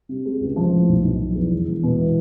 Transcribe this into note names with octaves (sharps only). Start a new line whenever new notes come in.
C3
G#3
C#2
F3
A2
B1
B1
F3
E2
E1
E1
B2
E3